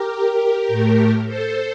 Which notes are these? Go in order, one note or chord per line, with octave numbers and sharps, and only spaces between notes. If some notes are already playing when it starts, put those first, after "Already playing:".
Already playing: G4 A#4
A2 A3
A4 C5